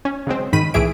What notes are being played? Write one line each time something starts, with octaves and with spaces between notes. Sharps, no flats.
C#4
C#3 F#3 G#3 C4
G#2 D#3 B5 B6 D#7
C2 A2 E3 G#4 E5 D7